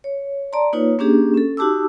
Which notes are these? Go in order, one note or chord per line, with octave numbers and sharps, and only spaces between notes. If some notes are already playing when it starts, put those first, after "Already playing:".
C#5
D5 A5 A#5 C6
A#3 D#4 F4 B4 C#5
A#3 C#4 D4 G4 G#4
C#4 A4
D#4 F#4 G4 A5 D6 E6